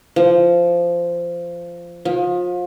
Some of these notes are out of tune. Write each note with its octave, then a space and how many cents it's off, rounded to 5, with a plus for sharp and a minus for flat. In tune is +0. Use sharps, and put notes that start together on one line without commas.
F3 -15
F3 +30